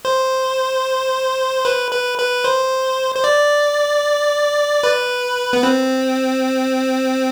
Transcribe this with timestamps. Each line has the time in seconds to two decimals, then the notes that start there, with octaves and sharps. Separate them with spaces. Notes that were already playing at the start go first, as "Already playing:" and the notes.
0.05 C5
1.65 B4
1.91 B4
2.18 B4
2.44 C5
3.15 C5
3.24 D5
4.83 B4
5.53 B3
5.63 C4